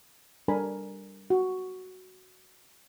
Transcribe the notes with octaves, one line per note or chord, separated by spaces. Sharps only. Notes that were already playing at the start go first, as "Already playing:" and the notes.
G3 D4 A4 A#4 G#5 B5
F#4